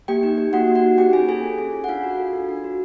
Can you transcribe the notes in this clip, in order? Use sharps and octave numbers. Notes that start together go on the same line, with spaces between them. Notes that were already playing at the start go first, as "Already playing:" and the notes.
A#3 G4 G5
D#4
G4
A#3 F#4 F#5
A#3
F#4 F#5
D#4
C#4 G4 G5
F4 G#4 G#5
G#4 A4 G#5
C#4
C#4
F4
F#5
D4 F4 F5
F#4
A4
D4
D4
F#4